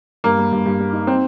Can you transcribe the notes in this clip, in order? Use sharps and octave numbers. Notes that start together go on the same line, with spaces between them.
G2 A#3
G3
G2
G2
G3
D#4
C4